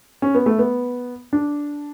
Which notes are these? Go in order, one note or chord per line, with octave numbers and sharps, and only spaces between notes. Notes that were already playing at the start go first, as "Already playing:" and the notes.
C#4
B3
A3
B3
D4